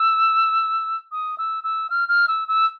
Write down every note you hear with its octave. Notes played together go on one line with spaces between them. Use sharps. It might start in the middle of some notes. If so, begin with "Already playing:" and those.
Already playing: E6
D#6
E6
E6
F6
F6
E6
E6